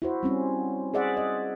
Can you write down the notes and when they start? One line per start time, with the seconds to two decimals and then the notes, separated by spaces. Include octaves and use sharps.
0.02 E4 F#4 C5
0.23 G3 C4 C#4
0.94 G#4 C5 D5 E5 F#5
1.17 D#5